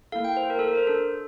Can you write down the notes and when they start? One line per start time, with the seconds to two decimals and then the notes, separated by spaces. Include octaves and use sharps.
0.12 A#3 E4 A4 F5
0.24 G5
0.37 C5
0.50 A#4
0.59 A4
0.68 A#4
0.77 C5
0.87 D4 A4